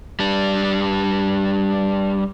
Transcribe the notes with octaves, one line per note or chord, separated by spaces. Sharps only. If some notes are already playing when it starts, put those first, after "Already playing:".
G3 D4